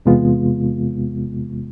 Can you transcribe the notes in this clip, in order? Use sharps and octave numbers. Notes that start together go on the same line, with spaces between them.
E2 C3 G#3 B3 F4